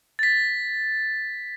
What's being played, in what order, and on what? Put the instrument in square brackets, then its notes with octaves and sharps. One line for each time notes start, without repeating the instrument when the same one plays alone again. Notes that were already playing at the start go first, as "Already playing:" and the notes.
[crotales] A6 B6